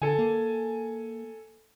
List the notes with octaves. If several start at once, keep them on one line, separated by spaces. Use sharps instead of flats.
D3 A4 G#5
A#3